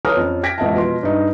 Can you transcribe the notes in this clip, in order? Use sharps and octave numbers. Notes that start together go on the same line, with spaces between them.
A4 B4 C#5 A#5 D#6 F6
F2 C#4
G5 G#6 A#6 B6 D7
E1 A1 F2 D#5 E5 A5
B2 F3 C6
G2 D#4